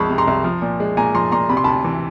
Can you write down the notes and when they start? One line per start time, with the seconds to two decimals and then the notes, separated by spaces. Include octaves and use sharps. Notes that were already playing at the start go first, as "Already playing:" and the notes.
Already playing: C2 F3 G#3 A5 B5 C#6
0.09 C3
0.18 A#5 C6
0.28 C2
0.44 F3
0.62 A#2
0.80 G#3
0.97 A#2 G#5 A#5
1.15 F3 A#5 C6
1.32 A#2 A#5 C6
1.49 C3 B5
1.57 C6
1.64 D2 A5 B5
1.84 E3